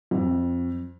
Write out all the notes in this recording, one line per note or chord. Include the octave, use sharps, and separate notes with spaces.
F2